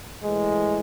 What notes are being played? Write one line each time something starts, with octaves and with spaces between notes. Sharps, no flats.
A2 E3 G#3